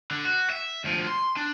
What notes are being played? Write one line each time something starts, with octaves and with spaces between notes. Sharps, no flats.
D3
F#4
E5
D2 F3
C6
D4